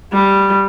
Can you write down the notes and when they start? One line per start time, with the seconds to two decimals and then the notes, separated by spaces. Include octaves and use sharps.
0.13 G3